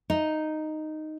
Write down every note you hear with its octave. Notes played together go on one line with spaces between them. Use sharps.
D#4